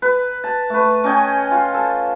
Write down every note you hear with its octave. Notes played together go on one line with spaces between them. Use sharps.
B4
A5
A3 B4
C#4 D#5 G5 G#5
F4
A4